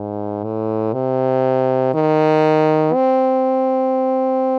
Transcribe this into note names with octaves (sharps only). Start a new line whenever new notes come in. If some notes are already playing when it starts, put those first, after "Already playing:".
Already playing: G#2
A2
C3
D#3
C4